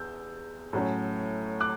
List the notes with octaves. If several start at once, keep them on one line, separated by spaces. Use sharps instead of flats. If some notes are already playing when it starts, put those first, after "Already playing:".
Already playing: E2 E6 G6
A2 F#3 C#4
D6 F#6